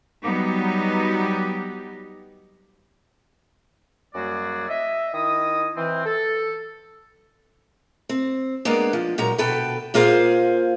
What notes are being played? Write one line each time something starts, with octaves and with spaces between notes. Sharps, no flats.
F#3 G3 B3 D#4 G4
F#2 G3 A#3 F#4 G#4 D5
D#5 E5
D#3 E4 D#5 D#6
E3 C4
A4
C4
G#3 A#3 B3 D4
F3
A#2 F#3 G#3 A#5
D2 B2 B3 A4 B4 G5
A#2 A#3 F4 G#4 C5 F5